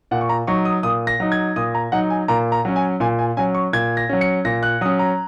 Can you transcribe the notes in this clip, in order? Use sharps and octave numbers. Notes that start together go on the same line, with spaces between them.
A#2 F#5
C#6
A#5
F#3 D#4 C#6
D#6
A#2 D#6
A#6
F#3 D#4
G#6
A#2 D#6
A#5
F#3 D#4 F#5
G#5
A#2 A#5
A#5
F#3 C#4
G#5
A#2 G#5
G#5
F#3 C#4 G#5
C#6
A#2 G#6
A#6
F#3 C#4
C#7
A#2 A#6
F#6
F#3 C#4 D#6
A#5